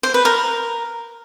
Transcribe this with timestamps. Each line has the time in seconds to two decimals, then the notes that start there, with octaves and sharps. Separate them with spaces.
0.03 C5
0.14 B4
0.25 A#4